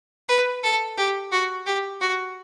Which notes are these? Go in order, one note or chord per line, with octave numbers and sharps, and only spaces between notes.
B4
A4
G4
F#4
G4
F#4